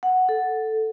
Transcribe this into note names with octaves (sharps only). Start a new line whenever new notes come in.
F#5
A4